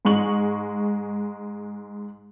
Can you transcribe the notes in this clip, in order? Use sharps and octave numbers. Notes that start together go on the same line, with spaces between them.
G#2 G#3 C#6 F#7